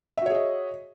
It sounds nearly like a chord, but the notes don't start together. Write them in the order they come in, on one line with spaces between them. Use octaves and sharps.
E5 F#4 C#5 G#4 D#5